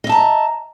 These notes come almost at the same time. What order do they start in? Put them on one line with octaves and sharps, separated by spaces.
D#5 E5 A5 A#5